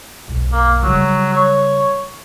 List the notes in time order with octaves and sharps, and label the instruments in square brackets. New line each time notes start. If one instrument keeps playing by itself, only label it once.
[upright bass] B1 F2
[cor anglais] A#3
[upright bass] C#3 G3 [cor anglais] F#3
[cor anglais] C#5